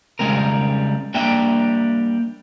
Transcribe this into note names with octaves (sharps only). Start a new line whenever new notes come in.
C#3 F3 G3 G#3 C4 A#4
G3 A#3 D4 E5 G5